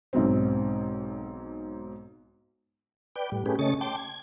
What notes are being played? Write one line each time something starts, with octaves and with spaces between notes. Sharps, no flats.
B1 G#2 F#3 C4
B4 D5 G5
A2 G3
A3 C#4 G4 G#4 B4
C#3 A3 C#4 C#5 D#5 A6
G5 A5 C6 D6
G#6